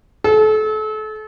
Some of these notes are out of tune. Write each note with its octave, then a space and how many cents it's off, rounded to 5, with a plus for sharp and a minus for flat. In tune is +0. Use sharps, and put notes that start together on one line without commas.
A4 -35